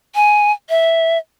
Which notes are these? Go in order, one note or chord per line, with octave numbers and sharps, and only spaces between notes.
G#5
E5